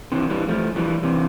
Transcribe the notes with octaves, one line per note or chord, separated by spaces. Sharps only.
C3 E3
E3 G3
F3 A3
E3 G3
C3 E3